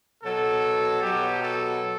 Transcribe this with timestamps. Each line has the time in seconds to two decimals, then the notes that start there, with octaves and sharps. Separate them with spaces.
0.23 B2 F#3 A4
1.01 B2 F#3 G4
1.41 A4